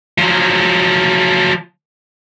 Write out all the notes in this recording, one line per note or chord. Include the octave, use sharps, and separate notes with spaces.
F3 F#3